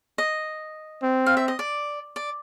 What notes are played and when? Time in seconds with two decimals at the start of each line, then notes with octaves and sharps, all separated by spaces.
0.18 D#5
1.03 C4
1.26 F5
1.37 E5
1.48 D#5
1.59 D5
2.16 D5